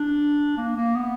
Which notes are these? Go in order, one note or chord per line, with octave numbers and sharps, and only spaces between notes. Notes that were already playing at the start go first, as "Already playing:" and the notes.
Already playing: D4
A#3
A#3
B3